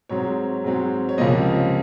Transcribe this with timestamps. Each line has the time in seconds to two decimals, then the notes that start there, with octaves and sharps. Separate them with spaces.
0.09 G#2 F#3 C4 C#5
0.64 G#2 F#3 C4
1.09 C#5
1.18 C#2 C3 F3 A#3 D#5